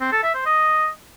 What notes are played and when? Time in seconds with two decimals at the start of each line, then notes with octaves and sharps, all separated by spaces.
0.01 C4
0.12 A4
0.23 E5
0.34 C5
0.46 D#5